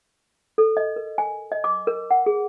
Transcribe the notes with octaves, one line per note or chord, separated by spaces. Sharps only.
A4
D#5
A#4
G#5
D#5
D6
A#4
F#5
G#4